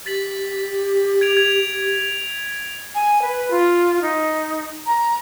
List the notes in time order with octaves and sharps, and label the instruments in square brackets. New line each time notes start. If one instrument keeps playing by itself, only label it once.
[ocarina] G4 [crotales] A6 B6 F#7
[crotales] G#6 D7 F7
G#6 F7
[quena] G#5
B4
F4
D#4
A#5